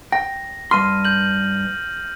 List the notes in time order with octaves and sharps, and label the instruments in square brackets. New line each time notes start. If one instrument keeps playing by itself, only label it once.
[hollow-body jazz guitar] G5 [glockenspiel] A#6
[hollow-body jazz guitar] G2 C6 [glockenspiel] F6 D#7
[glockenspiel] G6 F#7